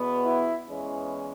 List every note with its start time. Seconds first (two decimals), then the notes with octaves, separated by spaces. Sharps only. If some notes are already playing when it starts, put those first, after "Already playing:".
Already playing: E2 B2 B3
0.22 E4
0.66 E2 E3 G#3 C#4